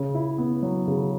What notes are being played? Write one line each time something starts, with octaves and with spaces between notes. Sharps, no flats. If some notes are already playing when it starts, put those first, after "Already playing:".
Already playing: C#3
E4
B3
F#3
C#3